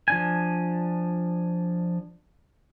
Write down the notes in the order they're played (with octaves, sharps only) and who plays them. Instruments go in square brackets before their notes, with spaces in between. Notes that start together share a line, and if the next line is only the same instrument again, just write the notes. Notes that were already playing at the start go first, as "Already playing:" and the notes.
[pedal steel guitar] F3 D4 G#5